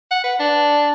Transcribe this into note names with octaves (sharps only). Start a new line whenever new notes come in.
F#5
B4
D4